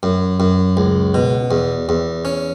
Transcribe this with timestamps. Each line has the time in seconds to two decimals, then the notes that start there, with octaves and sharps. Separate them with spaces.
0.03 F#2
0.40 F#2
0.77 C#2
1.14 B2
1.51 E2
1.89 E2
2.25 C#4